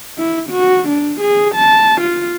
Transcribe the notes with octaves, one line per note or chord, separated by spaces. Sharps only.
E4
F#4
D4
G#4
A5
F4